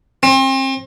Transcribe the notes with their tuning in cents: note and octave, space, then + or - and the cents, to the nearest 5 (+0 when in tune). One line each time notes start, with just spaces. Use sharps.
C4 +35